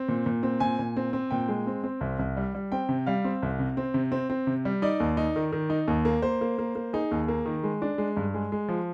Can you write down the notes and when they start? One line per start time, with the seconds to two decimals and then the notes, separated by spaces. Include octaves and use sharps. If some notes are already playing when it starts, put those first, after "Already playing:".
Already playing: C4
0.08 A#2
0.26 A#2
0.43 C4
0.60 A#2 G#5
0.79 A#2
0.97 C4
1.13 C4
1.30 A#2 G5
1.49 G#3
1.67 C4
1.84 C4
2.01 C2
2.19 C2
2.37 G3
2.55 G3
2.72 C4 G5
2.89 C3
3.07 G3 F5
3.25 C4
3.43 C2
3.59 C3
3.77 C4
3.94 C3
4.12 C4
4.30 C4
4.47 C3
4.65 G3
4.82 D#4 D5
5.00 D#2
5.17 D#4
5.36 D#3
5.52 D#3
5.70 D#4
5.88 D#2
6.05 A#3
6.22 A#3 C5
6.41 A#3
6.58 A#3
6.75 A#3
6.93 D#4 G#4
7.11 D#2
7.28 A#3
7.46 D#3
7.63 G#3
7.82 D4
7.98 G#3
8.17 G2
8.34 G#3
8.52 G#3
8.69 F3